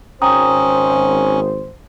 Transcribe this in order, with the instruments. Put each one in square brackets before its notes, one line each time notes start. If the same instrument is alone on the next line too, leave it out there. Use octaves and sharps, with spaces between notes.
[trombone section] G#1 C5 [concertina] C#4 [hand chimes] G5 A#5 D#6